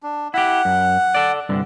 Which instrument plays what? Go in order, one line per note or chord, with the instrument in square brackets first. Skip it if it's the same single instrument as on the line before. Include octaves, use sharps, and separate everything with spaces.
[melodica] D4
[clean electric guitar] E4 G4 [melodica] F#5
[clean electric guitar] F#2
A4 D5
C2 G2 D3